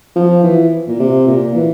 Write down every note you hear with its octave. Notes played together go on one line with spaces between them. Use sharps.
F3
E3
A#2
C3
A#2
E3